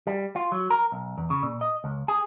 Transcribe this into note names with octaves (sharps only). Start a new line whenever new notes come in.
G3
F4
F#3
A#4
B1
E2
C#3
A#2
D#5
C#2
G#4